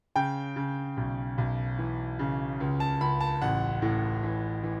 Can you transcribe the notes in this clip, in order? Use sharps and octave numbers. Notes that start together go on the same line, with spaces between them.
C#3 G5
C#3
B1
B1
E3
C#3
C#2
A5
C#2 B5
A5
A1 F#5
A2
E3
E3